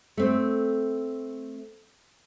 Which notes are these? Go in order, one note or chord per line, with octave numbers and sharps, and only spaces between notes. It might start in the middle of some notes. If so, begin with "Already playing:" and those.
A3 C4